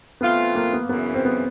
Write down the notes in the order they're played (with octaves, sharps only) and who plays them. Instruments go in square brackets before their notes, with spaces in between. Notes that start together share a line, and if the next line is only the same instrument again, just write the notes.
[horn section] E3 A3 C4 F4 [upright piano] B3
[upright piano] A#3
B3
[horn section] F#2 C#3 E3 [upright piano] B3
[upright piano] C4
B3